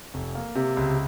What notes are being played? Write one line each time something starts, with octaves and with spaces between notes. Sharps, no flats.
F1
A#3
C3
C#2